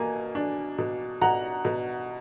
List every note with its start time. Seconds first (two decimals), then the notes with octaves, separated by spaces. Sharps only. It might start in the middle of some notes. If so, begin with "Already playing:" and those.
Already playing: B2 A#3 G#5
0.35 D4
0.78 B2
1.21 B2 F#5 A#5
1.65 B2